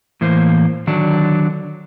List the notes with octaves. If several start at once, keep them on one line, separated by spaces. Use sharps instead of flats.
A2 E3 A#3 C5
D3 D#3 F#3 D4